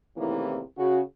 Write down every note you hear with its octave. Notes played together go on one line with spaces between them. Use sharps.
E2 A2 C3 D#3 E3 A#3
C#3 F#4